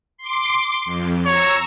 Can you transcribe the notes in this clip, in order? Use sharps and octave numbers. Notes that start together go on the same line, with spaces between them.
C6 D6
F2
C#5 A#5 C#6 E6